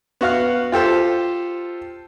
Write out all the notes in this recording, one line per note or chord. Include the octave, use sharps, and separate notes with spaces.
B3 F#4 F5 F6
F4 G4 A4 C5